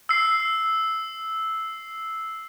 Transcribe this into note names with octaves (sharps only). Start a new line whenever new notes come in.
E6 C7